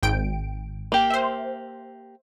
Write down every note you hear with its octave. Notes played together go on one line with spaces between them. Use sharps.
G#1 G5 D7
A#3 G4
C5 E5